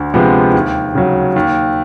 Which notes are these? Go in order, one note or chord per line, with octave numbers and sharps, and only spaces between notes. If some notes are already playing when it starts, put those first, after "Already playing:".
Already playing: D2
C3 F3 G#3 B3
D#2
C#3 F#3
D#2